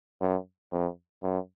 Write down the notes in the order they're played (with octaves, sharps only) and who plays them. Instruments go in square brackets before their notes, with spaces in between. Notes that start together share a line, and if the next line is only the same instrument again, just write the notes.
[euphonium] F#2
F2
F#2